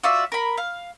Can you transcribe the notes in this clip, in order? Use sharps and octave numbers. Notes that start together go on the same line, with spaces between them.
F4 F#4 D5 E5
A#4 B5
F5